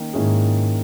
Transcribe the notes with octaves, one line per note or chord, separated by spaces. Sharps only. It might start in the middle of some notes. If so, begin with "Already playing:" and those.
Already playing: D#3 A#3 C#4
G#2 D#3 A#3 C#4 E4 G#4